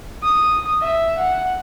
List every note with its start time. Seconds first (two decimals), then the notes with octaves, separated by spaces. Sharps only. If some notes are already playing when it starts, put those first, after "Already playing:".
0.23 D#6
0.81 E5
1.19 F#5